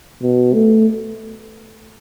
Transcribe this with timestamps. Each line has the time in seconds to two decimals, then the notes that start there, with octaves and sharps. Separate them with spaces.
0.23 B2
0.53 A3